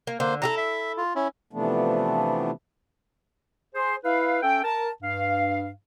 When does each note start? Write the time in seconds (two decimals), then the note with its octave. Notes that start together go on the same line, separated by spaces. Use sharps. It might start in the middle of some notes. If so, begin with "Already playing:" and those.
0.07 A#3
0.20 D3 A#3 C5
0.42 E4 G4 A4 A#5
0.57 E5
0.97 F4
1.15 C#4 E4
1.53 C3 E3 F3 A3 B3 D4
3.75 G#4 C5
4.04 E4 B4 F5
4.43 C#4 A4 E5 G5
4.64 A#4 A5
5.03 G2 F5